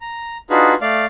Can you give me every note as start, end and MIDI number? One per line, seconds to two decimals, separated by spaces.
0.01 0.38 82
0.50 0.74 62
0.50 0.74 63
0.50 0.74 65
0.50 0.74 66
0.50 0.74 68
0.50 0.74 71
0.81 1.06 57
0.81 1.06 74
0.81 1.06 77